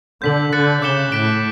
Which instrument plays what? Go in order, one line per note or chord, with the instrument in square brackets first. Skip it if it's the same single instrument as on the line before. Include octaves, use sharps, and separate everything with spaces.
[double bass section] D3 [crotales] G6 B6 F#7
[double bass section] D3 [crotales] F#6 A6 C#7
[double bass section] C#3 [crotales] D6 G6 C#7 E7 G7
[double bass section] A2 [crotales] F#6 B6 D7